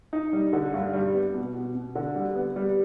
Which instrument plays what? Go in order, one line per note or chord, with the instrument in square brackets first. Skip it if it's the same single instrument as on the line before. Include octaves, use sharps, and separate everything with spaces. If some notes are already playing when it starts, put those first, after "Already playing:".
[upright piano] D#4
G3
D3
G2
G3
B3
B2
B2
B2
D3
G3
B3
G3